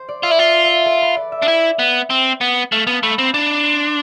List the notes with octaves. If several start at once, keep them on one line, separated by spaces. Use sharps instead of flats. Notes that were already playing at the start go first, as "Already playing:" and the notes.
Already playing: C5
D5
F4 E5
E4
F4
E5
A4
B4
D5
E5
D4
E4
B3
C4
B3
A3 F5
B3 A5
A3 B5
C4 D6
D4 D6
C6